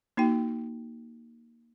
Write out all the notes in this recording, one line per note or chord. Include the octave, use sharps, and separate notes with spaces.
A#3 D#4 F#4 G5